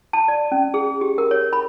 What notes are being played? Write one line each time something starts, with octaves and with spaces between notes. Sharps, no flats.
A5
D5
C#4
G#4
G4
A#4
C#5
B5